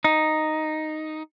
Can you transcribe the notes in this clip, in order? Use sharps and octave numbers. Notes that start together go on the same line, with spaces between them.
D#4